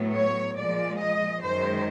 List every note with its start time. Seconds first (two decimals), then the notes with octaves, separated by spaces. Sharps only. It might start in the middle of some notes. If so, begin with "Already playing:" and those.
Already playing: A2 F#3 B3
0.13 C#5
0.57 A#2 F3 G#3 D5
0.99 D#5
1.41 F#2 D#3 G#3 C5